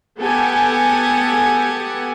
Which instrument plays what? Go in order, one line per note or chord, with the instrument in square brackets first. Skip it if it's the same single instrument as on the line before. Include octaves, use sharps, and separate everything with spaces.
[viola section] B3 G4 A4 F#5 G#5